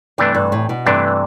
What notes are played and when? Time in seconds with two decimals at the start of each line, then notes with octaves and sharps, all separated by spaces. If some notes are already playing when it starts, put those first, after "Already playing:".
0.18 G2 C3 E3 A3 D4
0.35 G2
0.52 A2
0.69 B2
0.86 G2 C3 E3 A3 D4